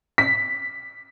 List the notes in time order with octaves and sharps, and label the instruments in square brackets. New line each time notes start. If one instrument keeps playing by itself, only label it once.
[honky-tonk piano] B6